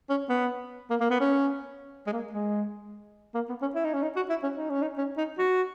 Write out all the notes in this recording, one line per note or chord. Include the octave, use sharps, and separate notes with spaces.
C#4
B3
A#3
A#3
B3
C#4
G#3
A#3
G#3
A#3
B3
C#4
E4
D#4
C#4
D#4
F#4
E4
C#4
D#4
C#4
D#4
C#4
D#4
F#4